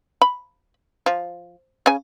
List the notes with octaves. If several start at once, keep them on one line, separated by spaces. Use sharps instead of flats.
B5
F3
C#3 G#5